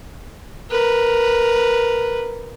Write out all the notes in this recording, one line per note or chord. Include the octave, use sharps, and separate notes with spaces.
A#4 B4